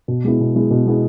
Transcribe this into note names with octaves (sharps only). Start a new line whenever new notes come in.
B2
G#3 B3 E4
B2
G#3 B3 E4
B2
G#3 B3 E4